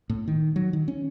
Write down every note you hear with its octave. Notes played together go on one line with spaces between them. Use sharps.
A2
D#3
F#3
D#3
C#4